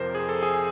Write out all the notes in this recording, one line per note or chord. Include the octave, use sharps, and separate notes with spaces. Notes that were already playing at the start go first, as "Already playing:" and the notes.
Already playing: F2 C3 F3 A#4 C5
G#4
A4
G#4